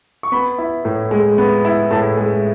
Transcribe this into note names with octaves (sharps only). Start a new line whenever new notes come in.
C#6
B3 B5
E4
A2
G#3
B3
E4
A2 A5
G#3